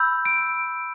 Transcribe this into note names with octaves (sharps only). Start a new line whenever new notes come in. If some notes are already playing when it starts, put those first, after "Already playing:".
Already playing: B5 E6 G6
D7